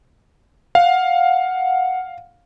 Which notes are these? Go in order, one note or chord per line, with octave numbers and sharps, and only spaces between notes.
F5 F#5